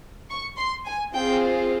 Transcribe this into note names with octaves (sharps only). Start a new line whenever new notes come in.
C#6
C6
G#5
C4 F4 G#4 G5